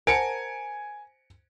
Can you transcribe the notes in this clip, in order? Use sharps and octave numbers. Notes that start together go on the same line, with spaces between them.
A#4 C5 F#5 G#5 A5 C#7 D7